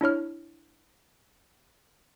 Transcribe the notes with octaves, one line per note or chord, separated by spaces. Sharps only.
D4 E4 C#5 F6